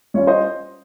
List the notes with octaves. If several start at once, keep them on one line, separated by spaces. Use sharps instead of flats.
G3 C#4 F4 C#5
C5 D#5